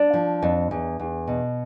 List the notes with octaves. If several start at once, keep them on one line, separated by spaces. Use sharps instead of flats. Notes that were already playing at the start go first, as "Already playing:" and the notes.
Already playing: D4
F3
F2
E2
E2
B2